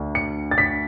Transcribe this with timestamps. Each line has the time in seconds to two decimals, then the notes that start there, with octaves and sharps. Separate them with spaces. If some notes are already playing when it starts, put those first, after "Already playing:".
Already playing: D2
0.15 C#7
0.51 A6
0.58 B6